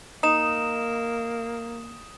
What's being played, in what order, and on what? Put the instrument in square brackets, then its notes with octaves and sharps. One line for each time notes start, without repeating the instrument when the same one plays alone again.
[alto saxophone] A#3 [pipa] D#4 [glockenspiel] D#6 E7